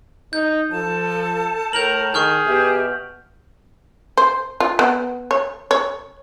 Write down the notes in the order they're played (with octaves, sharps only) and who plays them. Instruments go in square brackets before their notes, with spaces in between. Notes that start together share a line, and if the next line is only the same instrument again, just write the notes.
[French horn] D#4 [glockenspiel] G6
[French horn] F3 [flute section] A4 A5
[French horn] A2 [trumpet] A#4 [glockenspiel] G6 F7 F#7
[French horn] D#3 [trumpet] G#4 [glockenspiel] C#6 F6 G6
[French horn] B2 [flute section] G4 E5
[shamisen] C5
F4
B3
C#5
C#5